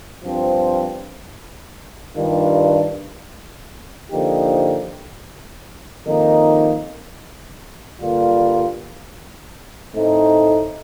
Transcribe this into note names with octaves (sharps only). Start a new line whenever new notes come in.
G2 F3 C4
G2 D#3 G3 D4 F4
D3 F3 A#3 D#4 G4
F2 D#3 A#3 D#4
G2 D3 G3 A#3 F4
A2 A3 C4 D#4